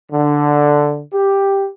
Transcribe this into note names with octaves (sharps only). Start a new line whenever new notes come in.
D3
G4